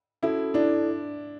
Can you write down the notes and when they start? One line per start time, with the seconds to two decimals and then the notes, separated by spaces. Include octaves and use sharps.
0.23 C#4 E4 F#4 A4
0.54 D4 E4 A4 D5